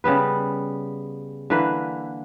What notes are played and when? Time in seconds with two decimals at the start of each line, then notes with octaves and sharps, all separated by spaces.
0.04 C#3 G3 B3 B4
1.50 D3 E3 A#3 B4